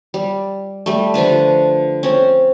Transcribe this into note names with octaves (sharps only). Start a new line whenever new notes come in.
G3
G3 A3
D3 F3 F4 B4
C4 C#4